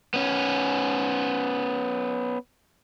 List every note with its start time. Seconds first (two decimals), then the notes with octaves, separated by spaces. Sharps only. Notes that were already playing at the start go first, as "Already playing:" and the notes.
0.14 B3 C#4